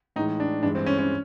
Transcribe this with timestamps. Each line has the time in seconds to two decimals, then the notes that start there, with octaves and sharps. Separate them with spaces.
0.16 A2 E3 G#3 D#4
0.40 D4
0.63 G2 E3 G#3 D4
0.75 C4
0.86 C#4
0.98 C#4